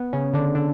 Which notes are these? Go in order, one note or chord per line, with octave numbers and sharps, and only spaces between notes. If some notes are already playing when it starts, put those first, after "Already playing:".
Already playing: B3
C#3 C#4
D3 D4
D3 D4